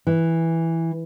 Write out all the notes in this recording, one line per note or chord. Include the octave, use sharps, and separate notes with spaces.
E3